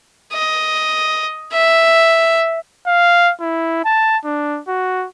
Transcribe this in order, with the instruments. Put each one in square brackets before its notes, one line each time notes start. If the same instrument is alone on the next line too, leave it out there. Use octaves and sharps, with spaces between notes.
[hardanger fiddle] D#5
E5
[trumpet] F5
E4
A5
D4
F#4